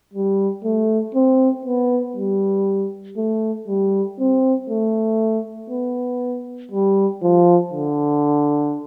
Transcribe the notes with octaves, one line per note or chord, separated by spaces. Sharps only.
G3
A3
C4
B3
G3
A3
G3
C4
A3
B3
G3
F3
D3